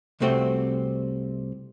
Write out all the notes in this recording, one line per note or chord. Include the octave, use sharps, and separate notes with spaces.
C2 C3 A3 C4 F#4 G5